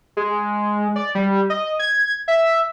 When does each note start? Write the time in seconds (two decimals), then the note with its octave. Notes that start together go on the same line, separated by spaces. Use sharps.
0.17 G#3
0.96 D5
1.15 G3
1.50 D#5
1.79 G#6
2.28 E5